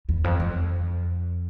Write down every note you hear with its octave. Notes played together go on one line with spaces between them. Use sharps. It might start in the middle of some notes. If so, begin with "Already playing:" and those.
E2
F2
F2